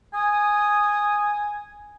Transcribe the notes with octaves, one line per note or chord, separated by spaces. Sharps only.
G#5 D#6